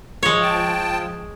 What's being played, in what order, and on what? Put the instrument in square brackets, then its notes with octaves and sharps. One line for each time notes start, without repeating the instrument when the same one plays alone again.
[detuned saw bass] F3 [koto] G#3 C#5
[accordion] G5 A5